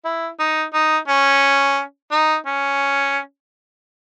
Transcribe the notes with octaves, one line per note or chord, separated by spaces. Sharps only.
E4
D#4
D#4
C#4
D#4
C#4